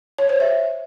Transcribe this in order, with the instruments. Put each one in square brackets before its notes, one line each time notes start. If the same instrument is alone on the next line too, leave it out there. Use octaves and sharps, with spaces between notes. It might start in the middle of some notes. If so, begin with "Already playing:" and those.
[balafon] C#5
C5
E5